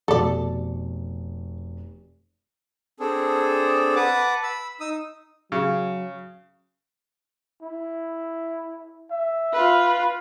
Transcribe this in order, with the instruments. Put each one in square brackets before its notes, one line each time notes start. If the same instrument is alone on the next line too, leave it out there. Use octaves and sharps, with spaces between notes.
[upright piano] F1 B2 [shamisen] A4 D5
[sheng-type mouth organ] C4 D4 G#4 A4
B4 F#5 A5 D6
B5 E6
D#4 D#6 E6
[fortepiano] C#3 [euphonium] F#3
[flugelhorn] E4
E5
[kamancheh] F4 B4